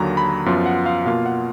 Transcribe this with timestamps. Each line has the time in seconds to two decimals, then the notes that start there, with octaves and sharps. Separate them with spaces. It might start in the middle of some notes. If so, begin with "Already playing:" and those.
Already playing: D#2 D3 F#3 A#3 A#5
0.17 B5
0.46 F#2 F3 B3 F4
0.66 F#5
0.86 F5
1.05 B2 A#3 F4 F5
1.26 F#5